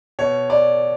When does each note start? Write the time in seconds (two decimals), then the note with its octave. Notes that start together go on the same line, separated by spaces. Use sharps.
0.19 B2 C#5
0.50 D5